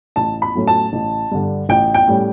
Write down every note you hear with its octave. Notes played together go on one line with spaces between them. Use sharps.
A1 A5
B5
A2 F#3 A3 C#4
A5
A1
G2 D3
A1 G5
G5
A2 G3 C#4